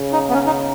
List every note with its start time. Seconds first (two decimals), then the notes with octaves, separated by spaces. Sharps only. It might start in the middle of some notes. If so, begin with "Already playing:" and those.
Already playing: C#3
0.12 D#4
0.29 B3
0.33 C#4
0.46 D#4